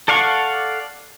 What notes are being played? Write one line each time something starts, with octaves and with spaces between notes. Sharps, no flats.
A4 D5 F5 F#5 C#6